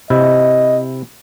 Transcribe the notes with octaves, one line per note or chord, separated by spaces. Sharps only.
C3 E4 D#5